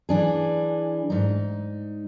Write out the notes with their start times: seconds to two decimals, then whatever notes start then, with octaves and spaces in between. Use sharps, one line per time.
0.09 E3 D4 G#4
1.10 G#2 D#4